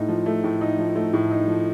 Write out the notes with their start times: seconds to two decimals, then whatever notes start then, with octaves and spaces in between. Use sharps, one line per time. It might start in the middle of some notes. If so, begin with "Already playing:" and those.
Already playing: A2 A3 D#4
0.09 F3
0.26 A3
0.44 A2
0.61 D#4
0.78 F3
0.95 A3
1.13 A2
1.31 D#4
1.47 F3